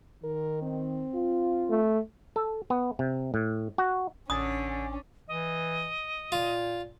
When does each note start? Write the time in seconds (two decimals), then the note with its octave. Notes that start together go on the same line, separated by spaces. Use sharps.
0.24 D#3 A#4
0.62 C4
1.15 F4
1.70 A3
2.36 A4
2.70 B3
2.99 C3
3.34 A2
3.78 F#4
4.30 A1 D3 C#4 G#5 D#6 A6
5.28 E3 D#5
6.32 A#2 F4